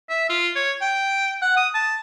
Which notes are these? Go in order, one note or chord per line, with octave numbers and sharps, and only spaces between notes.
E5
F4
C#5
G5
F#5
D#6
A5